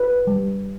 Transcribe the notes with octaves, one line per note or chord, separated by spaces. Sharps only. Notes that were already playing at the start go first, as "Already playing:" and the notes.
Already playing: F#4 B4
G3